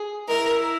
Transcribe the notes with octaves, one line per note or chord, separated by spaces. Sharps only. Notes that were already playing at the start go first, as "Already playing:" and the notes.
Already playing: G#4
G#3 E4 A#4